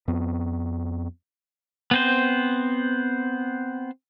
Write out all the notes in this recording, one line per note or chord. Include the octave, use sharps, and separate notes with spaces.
F2 B3
B3 C4 C5